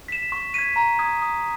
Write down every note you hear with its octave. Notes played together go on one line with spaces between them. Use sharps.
B6 E7
C#6
G#6 B6 D#7
A#5
D#6 G#6
D#6